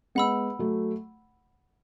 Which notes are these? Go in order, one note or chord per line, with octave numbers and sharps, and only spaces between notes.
G#3 B3 F#5 B5 E6
F#3 A3